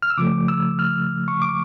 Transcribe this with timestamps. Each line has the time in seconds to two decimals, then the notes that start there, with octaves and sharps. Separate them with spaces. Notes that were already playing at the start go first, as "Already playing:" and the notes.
0.02 F6
0.10 E6
0.18 C#3 F3 A3 D6
0.48 E6
0.79 F6
1.28 C#6
1.42 D6